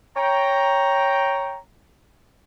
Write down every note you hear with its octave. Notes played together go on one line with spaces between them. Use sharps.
C#5 G5 A#5